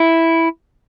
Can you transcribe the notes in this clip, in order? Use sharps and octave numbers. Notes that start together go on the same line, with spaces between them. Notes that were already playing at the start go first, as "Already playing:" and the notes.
Already playing: E4